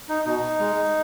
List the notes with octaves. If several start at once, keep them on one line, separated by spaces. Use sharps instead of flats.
D#4
B2 D#4
G#3